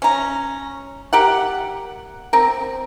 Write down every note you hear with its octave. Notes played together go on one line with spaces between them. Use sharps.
C#4 A#5
G4 A#4 F#5
C4 A#4